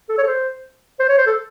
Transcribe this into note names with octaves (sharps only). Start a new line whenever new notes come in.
A4
C#5
A4
C5
C5
C#5
C5
A4